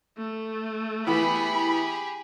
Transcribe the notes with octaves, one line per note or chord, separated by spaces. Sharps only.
A3
E3 B3 G4 G#4 B5